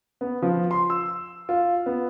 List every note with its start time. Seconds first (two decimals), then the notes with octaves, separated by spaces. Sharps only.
0.21 B3
0.42 F3
0.71 C6
0.90 E6
1.49 F4
1.86 B3